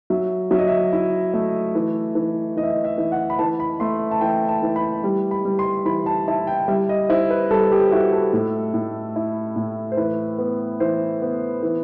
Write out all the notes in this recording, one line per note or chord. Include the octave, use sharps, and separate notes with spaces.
F#3 E5
F#3 E5
D#5
E5
E4
A3
E3
E3
E3 D#5
E5
D#5
E5
E3
F#5
B5
E3 A5
B5
A3 C6
A5
E3 G5
A5
E3
B5
G3
B5
G3
C6
E3 B5
A5
E4 A5
G5
G3 E5
D#5
E4 C5
B4
G3 A4
G4
E4 F#4
A4
A2
A2
E4
A2
C5
E3 B4
B3
E3 C5
B3
E3